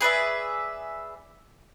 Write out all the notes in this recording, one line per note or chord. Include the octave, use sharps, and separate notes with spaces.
G#4 B4 D5 E5